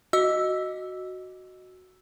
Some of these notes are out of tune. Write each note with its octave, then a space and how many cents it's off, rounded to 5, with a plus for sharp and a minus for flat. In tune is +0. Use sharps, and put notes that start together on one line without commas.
F#4 +0 D#5 +0 E6 +0